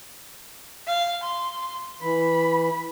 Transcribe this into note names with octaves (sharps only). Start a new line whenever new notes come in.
F5
C6
E3 B5